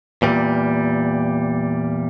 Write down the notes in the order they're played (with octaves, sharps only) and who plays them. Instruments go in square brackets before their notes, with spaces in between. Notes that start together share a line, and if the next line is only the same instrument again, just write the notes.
[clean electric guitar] E2 A#2 G3